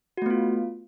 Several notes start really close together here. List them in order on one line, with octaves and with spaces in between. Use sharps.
F#4 A3 B3 F4